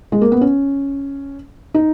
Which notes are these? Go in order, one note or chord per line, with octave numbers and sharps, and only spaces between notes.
G#3
A#3
B3
C#4
D#4